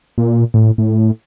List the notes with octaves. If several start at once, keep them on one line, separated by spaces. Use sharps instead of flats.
A#2
A2
A2